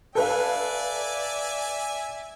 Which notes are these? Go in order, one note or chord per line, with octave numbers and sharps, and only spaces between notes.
A4 B4 D5 E5 F5 G#5